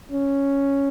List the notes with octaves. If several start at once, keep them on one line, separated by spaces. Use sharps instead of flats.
C#4